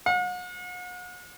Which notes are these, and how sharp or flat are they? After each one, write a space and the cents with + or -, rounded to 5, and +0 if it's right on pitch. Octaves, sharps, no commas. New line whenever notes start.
F#5 -40